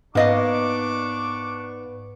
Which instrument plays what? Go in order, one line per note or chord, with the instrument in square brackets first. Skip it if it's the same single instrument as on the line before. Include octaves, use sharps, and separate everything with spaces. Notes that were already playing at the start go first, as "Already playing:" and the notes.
[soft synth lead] G#2 [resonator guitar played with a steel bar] A#3 D#5 F5 [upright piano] B3 [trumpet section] D4 C#6 D6